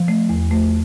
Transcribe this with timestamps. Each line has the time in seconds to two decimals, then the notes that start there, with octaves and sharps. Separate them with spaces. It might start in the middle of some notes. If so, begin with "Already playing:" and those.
Already playing: F3
0.08 A3
0.29 E2
0.51 A3